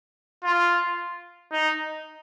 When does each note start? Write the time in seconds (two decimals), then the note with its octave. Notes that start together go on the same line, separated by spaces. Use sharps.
0.44 F4
1.52 D#4